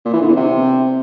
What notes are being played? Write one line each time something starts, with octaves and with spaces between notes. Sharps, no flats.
A#2
E3
D3
E2
C3